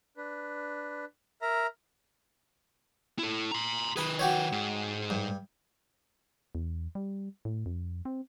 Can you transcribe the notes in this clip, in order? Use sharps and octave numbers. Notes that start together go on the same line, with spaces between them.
D4 B4
A#4 E5 A#5
E4 A4
A#5 C6
D#3 G#4 B4 B5
F#4 G4 C#5
G#2
G2
E2
G3
A2
F2
C4